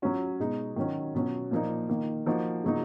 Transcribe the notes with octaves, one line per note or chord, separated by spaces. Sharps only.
F#3 C#4 F#4
B2 G#3 D#4
D#3 F#3 C#4 F#4
B2 F#3 C#4
A#2 F3 A#3 D#4
D#3 A#3 D#4
F3 A#3 D#4 F#4
C#3 F#3 A#3 D#4